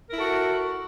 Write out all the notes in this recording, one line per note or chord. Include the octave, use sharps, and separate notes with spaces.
E4 F#4 A4 A#4